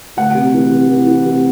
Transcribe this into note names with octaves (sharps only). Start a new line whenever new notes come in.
D2 F#5
C3
E3
C3
E3
E3
C3